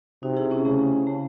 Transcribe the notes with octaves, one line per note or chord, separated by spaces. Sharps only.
C3 D#4 F#4
E4 G#4
C#4 E4
C#3 A3 C#4
A3